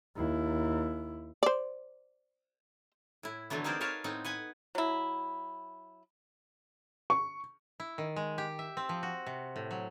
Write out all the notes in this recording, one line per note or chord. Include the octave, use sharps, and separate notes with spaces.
D#2 E4
C5 D5
A2 E4
D3 E3 F#3 A3 B3
C4 D#4 G#4 A#4 C5 D5
A#4 B4 C#5 F5 A5
A2 B3 C4 D#4
B4 F#5 G#5
F#3 E4
C#6
E4
D#3
G#3
G4
E5
C4
F3
F#4
C3
A2
F#3